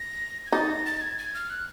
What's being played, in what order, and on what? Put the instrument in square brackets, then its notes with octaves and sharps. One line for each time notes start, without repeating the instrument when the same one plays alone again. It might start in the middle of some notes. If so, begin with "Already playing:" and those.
Already playing: [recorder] A#6
G#6
[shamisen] D#4 [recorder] A6
[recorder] A#6
A6
G#6
G#6
F6
F#6